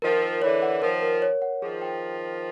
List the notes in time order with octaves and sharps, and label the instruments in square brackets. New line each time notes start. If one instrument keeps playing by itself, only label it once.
[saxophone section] D#3 F3 [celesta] A#4
[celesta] A#4
[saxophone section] D3 E3 [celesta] C#5
[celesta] F#5
[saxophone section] D#3 F3 [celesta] A#4
[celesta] A#4
C#5
F#5
[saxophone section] D#3 F3 [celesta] G#4
[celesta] G5